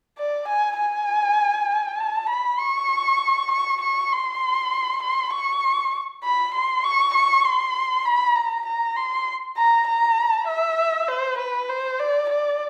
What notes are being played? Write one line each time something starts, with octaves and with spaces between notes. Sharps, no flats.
D5
G#5
G#5
A5
B5
C#6
C#6
C#6
C6
C6
C#6
B5
C6
C#6
C#6
C6
B5
A#5
A#5
C6
A#5
A#5
E5
C5
B4
C5
D5
D5